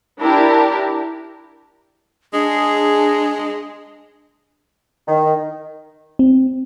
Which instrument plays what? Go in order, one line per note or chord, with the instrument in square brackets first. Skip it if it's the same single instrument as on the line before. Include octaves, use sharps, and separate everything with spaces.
[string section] D4 E4 G4 A#4
[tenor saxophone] G#3 [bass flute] D4 [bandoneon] G#4
[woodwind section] D#3
[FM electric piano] C4